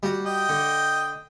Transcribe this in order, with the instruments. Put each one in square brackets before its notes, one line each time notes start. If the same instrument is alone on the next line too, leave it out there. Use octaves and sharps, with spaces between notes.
[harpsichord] G3 F#4
[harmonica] D#5 G5
[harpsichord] D3